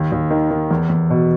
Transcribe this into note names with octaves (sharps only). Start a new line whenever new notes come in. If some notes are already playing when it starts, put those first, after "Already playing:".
Already playing: D#2
D#2
D#3
D#3
E2
E2
B2